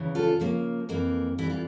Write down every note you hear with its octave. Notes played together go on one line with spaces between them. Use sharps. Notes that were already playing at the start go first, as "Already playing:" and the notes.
Already playing: E2 C#3 E3
F4 A4
C#3 F3 A#3
F2 E3 A#3
F2 E3 G3 E4
F4